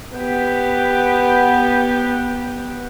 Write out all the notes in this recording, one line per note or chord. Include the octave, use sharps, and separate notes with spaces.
B3 G4